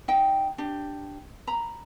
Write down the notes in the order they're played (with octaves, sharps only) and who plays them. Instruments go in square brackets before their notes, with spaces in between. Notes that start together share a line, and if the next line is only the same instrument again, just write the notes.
[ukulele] D#4 G5
D4 G4
A#5 B5